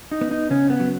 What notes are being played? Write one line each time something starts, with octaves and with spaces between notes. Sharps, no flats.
D#4
B3
D#4
C#3 C#4
B3
F#3